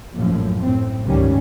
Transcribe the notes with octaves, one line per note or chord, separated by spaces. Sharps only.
A#1 F#2 A2 F3
A2 C4
G1 C#2 G#2 D#3 G3 C#4